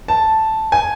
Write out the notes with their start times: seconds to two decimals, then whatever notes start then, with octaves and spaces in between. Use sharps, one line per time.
0.08 A5
0.72 G#5